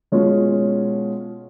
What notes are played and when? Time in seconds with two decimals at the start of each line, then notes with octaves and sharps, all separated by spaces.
0.12 B2 G#3 C#4 F4